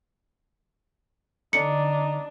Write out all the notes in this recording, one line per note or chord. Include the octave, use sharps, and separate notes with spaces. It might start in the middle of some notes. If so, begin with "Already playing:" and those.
D3 D4 D#4 C#7